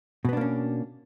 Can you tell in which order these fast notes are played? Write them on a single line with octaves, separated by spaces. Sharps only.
B2 B3 D4 A#3 C#4